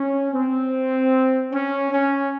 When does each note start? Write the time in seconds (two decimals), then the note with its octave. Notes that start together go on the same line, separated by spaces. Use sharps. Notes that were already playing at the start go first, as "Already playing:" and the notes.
Already playing: C#4
0.33 C4
1.53 C#4
1.91 C#4